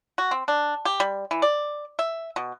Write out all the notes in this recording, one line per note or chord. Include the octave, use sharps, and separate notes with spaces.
F#4
C4
D4
G4
G3
E3
D5
E5
B2